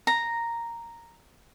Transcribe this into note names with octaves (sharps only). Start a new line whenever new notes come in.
A#5